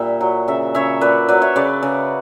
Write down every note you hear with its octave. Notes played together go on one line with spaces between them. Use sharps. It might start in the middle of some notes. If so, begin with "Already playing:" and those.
Already playing: A#2 G3 E5
F#3
C#3 E5
C#3 C#5 E5
A#2 B4 D5
F#3 B4 D5
C#5 E5
C#3 B4 D5
C#3